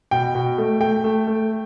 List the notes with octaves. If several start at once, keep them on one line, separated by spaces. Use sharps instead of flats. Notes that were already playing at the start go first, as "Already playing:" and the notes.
B2 G5
B2
A3
A3 G5
A3
A3